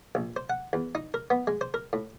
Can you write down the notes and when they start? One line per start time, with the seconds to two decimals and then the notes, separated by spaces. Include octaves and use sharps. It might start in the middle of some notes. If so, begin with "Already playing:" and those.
0.15 A#1
0.36 C5
0.50 F#5
0.73 E2
0.95 D#4
1.14 A#4
1.30 B3
1.47 G#3
1.61 C5
1.74 A#4
1.93 A2